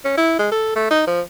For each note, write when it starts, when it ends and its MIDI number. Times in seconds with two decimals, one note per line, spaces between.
0.05 0.16 61
0.18 0.35 64
0.39 0.51 56
0.52 0.71 69
0.76 0.89 57
0.91 1.03 63
1.07 1.21 53